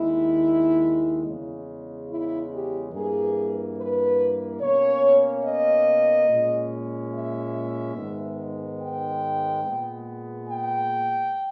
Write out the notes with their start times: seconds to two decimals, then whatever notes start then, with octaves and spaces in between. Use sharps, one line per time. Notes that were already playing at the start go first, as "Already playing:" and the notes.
Already playing: D#2 D#3 G#3 E4
1.25 E2 C#3 G#3
2.10 E4
2.52 G4
2.93 G2 E3 A#3 G#4
3.77 B4
4.61 B2 A#3 C#4 C#5
5.44 D#5
6.28 A#2 G#3 C#4
7.12 E5
7.96 G#2 D#3 G#3 B3
8.80 G5
9.64 A#2 G#3 B3
10.47 G5